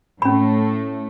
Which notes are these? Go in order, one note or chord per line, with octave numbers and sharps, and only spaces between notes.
A2 A3 C#4 B5